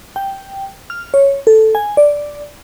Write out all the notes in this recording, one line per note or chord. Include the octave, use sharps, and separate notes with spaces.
G5
F6
C#5
A4
G#5
D5